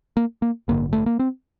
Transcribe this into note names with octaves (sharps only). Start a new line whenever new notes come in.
A#3
A#3
A1 G2 D3 A#3
A3
A#3
C4